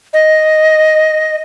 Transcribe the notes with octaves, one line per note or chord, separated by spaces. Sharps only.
D#5